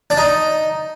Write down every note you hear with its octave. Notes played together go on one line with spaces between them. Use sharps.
D4
D#4